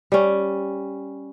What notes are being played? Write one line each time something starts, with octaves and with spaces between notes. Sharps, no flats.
G3 C#4